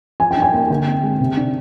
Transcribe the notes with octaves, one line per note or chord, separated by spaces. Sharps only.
F3 G#5
G5
D4
G#5
A#3
D3 G5
C4
G#3
C3
D4